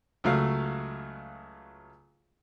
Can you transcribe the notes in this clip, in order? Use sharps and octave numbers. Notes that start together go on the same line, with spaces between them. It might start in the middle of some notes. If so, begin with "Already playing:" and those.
C#2 F#3 A3 F5